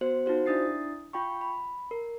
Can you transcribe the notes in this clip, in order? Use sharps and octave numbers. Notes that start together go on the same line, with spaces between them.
B3 F#4 C5
D#4 F4 F#4 C5
D4 E4 D#6 A6 C7
F4 G5 B5 C#6
B5
A#4